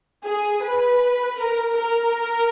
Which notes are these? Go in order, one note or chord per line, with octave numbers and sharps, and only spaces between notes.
G#4
B4
A#4
A#4